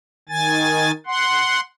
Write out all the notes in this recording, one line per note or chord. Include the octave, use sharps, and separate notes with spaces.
D#3 G#5 A6
F#5 C6